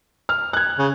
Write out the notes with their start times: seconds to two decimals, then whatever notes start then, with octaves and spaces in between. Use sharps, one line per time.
0.29 F6
0.53 F#6 G#6
0.79 C#3